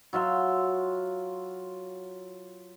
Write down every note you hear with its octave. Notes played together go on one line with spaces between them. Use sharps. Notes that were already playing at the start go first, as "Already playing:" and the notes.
F#3 F4 E5 C6